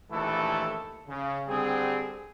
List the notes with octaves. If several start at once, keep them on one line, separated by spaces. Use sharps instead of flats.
A#1 D#2 E3 A3 E4 A4
C#3
D3 G3 C4 G#4